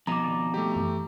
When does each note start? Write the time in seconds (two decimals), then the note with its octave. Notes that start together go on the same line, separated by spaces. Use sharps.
0.07 F2 B2 D#4 A#5 D6
0.24 D#3 D5
0.54 A3 G4
0.76 F#2 E3